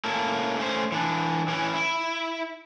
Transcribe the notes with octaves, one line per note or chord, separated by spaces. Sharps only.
A#3 C#4 E4 A4
A3 C#4 C5
E3 D4
E3 C#4 E4
E4